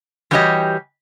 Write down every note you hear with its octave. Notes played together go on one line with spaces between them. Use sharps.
E3 G3 F#4 G4 C#5 D#5